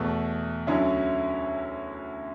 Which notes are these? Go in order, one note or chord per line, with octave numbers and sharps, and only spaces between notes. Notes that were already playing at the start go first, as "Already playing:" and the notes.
Already playing: E2 B2 A3
D2 D3 F#3 C#4 E4